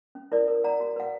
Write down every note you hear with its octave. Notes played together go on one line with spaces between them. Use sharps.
C#4
E4 A#4 D5
A#4
D5 F#5 A#5
F#4
B4 F#5